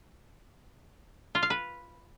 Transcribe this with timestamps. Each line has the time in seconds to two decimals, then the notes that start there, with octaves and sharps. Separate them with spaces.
1.35 F4
1.43 F5
1.50 B4